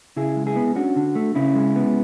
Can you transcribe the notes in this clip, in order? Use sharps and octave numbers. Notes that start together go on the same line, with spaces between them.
C#3 E4 G#4
G#3
E4 G#4
B3
C#4 D4 F#4
D3
A3
C#3 C#4 E4
G#3
B3